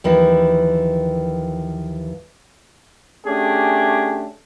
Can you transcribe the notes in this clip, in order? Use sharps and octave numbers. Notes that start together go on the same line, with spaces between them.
D#2 E3 F3
A3 C#4 D4 G4 G#4